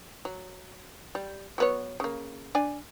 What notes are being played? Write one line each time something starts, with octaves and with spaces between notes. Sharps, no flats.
F#3
G3
F#3 B3 C#5
C#3 A#3
D4 D5 G#5